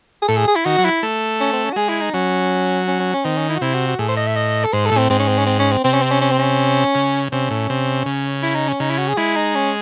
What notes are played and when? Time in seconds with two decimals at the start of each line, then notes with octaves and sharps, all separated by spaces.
0.22 G#4
0.28 A2 A4
0.37 G#4
0.48 G#4
0.56 E4
0.65 D#3 F#4
0.78 F#3
0.85 E4
1.03 A3
1.40 C#4
1.53 C4
1.65 C#4
1.73 F#4
1.76 G#3 G#4
1.89 E4
2.01 D#4
2.13 F#3 C#4
2.87 C#4
3.00 C#4
3.13 C#4
3.25 D#3 C4
3.38 C#4
3.49 E4
3.56 F#4
3.61 C3 E4
3.74 F#4
3.87 F#4
3.99 A2 G#4
4.08 C5
4.17 D#5
4.27 E5
4.36 D#5
4.65 A4
4.73 G#2 C5
4.85 A4
4.91 A2
4.98 C4
5.10 G#2 C4
5.19 C#4
5.28 C4
5.38 C#4
5.46 C4
5.59 C#4
5.72 C4
5.84 C3 C4
5.94 C#4
6.02 C4
6.11 C#4
6.21 C#4
6.32 C4
6.39 C#4
6.95 C#3
7.32 C3 C#4
7.51 A2
7.70 C3
8.06 C#3
8.43 E4
8.55 D#4
8.68 C#4
8.80 C#3 D#4
8.90 E4
8.98 F#4
9.08 G#4
9.17 G#3 E4
9.36 D#4
9.55 C#4